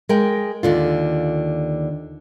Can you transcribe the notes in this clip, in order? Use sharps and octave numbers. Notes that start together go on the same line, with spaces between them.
G#3 A#4 G5
D#2 D3 F4